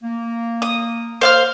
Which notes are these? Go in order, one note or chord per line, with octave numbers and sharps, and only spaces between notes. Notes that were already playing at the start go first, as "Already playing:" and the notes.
A#3
D#6
C5 F5 F6